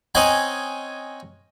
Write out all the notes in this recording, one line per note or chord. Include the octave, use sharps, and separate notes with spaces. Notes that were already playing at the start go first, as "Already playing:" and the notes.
C4 C#4 D#5 F#5 G#5 A#5